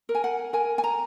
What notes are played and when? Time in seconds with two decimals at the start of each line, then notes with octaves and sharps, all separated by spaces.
0.09 A#4
0.15 G#5
0.24 F#5
0.53 A#4 G#5
0.78 G#5
0.84 A#5